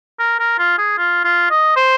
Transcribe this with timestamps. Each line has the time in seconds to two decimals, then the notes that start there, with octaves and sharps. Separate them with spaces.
0.19 A#4
0.40 A#4
0.59 F4
0.78 G#4
0.98 F4
1.24 F4
1.50 D#5
1.76 C5